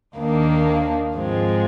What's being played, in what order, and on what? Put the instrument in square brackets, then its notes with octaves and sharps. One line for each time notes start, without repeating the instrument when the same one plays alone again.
[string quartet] D#2 D#3 A#3 D4
G#2 F3 G#3 C4 F4